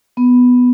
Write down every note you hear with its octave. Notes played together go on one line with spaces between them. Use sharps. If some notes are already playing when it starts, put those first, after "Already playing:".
B3